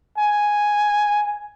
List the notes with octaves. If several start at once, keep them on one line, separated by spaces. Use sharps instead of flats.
G#5